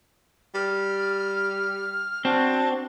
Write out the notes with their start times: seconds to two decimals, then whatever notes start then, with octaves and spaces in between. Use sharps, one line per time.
0.54 G3 F6
2.25 C4 D4 F#4 A5